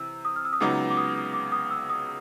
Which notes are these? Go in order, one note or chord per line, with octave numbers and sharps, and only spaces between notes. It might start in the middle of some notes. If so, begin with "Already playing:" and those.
Already playing: C3 E3 E6
D#6
F6
E6
D#6
C#2 C#3 F#3 B3 D#4 D6
D6
D#6
D6
D#6
E6
D#6